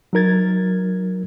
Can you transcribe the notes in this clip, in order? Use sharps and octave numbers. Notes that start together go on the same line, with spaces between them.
F#3 D#4 A#4 G#6 A6